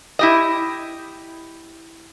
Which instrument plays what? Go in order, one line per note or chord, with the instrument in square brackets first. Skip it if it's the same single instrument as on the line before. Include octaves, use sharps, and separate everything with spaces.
[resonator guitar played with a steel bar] E4 G4 D#5